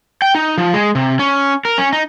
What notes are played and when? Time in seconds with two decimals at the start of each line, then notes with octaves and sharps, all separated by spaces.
0.22 G5
0.35 D#4
0.58 F3
0.74 G#3
0.95 C3
1.19 C#4
1.65 A#4
1.78 C#4
1.93 D#4